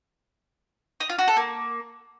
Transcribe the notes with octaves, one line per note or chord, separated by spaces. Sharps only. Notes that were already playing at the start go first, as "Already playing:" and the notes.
D#4
F4
F#4
A4
A#3